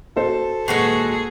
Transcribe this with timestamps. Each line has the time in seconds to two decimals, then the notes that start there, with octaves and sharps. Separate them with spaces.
0.17 F#4 A4 C5
0.68 D#1 G#3 F#4 G#4 B4 C7